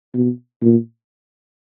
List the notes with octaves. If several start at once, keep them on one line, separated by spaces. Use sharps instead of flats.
B2
A#2